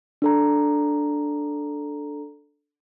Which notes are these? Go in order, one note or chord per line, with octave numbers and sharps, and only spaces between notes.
D4 A4 A#5